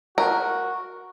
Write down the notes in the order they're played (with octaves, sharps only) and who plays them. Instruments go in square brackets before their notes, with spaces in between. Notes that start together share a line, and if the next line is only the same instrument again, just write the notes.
[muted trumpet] F#4 [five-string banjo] A#4